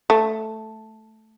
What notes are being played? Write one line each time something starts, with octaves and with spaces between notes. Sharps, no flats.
A3